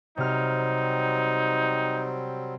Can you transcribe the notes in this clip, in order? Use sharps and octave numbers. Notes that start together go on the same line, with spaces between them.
C3 F#3 G3 C4 D#4 F6